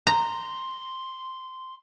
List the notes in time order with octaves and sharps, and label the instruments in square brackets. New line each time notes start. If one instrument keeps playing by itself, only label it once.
[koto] A#5 [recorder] C6